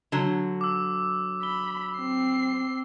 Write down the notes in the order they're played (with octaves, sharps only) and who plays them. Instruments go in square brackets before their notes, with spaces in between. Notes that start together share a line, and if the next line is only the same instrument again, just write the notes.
[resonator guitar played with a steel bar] D3 F#3
[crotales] D6 E6
[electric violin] B5 [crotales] G7
[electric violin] C4 C7